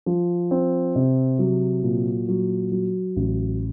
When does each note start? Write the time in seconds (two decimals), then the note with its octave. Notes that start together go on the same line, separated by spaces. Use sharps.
0.06 F3
0.51 C4
0.96 C3
1.39 F#3
1.83 A#2
2.28 F#3
2.72 F#3
3.16 A1